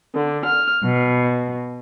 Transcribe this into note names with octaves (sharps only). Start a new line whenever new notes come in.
D3
F6
B2